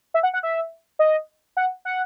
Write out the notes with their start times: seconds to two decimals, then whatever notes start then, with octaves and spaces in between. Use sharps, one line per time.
0.14 E5
0.23 F#5
0.34 F#5
0.43 E5
0.99 D#5
1.57 F#5
1.85 F#5